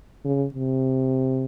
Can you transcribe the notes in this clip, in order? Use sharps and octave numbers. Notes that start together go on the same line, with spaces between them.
C#3
C3